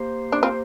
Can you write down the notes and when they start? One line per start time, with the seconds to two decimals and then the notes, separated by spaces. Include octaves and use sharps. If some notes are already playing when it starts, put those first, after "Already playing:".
Already playing: A#3 G4 C5
0.32 D4
0.43 C4 F4